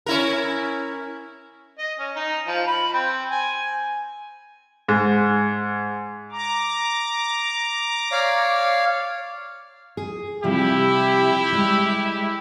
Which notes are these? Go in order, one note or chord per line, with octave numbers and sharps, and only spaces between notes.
C#4 E4 A#4
D#5
C#4
D#4
F3
B5
C4
G#5
G#2
A#5 D6
C#5 D5 F5
G#4
C3 F3 G3 E4 G4
G3 G#3